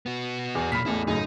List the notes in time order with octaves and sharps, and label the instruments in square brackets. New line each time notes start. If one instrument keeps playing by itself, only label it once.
[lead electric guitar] B3 F#4
[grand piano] E2
[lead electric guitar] B1 A#2 [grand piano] B5 F6 B6
[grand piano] A1 E2 A2 [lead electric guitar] E4 A4
[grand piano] F#2 A2 C#3 [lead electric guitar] D#4